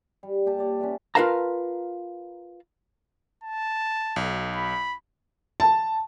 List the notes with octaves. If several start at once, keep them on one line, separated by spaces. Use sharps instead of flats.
G3
A#2 G4 G5 A5
C#5 D5
C#4 B4 D5 E5
F4 A#4 B4 F5 A5 A#5
A5
B1
B5
A5